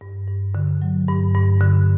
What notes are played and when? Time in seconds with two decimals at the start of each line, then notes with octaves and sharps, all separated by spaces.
0.01 G2
0.28 G2
0.55 D3
0.82 F#3
1.08 G2
1.34 G2
1.61 D3